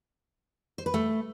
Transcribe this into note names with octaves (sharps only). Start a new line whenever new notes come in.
C5
B4
A3